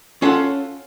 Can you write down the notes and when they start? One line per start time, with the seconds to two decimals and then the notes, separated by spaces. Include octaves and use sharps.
0.22 C#4 F4 A4 C#5 F5 F#5